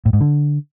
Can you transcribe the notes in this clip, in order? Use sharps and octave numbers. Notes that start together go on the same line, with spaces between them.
A2
G#2
D3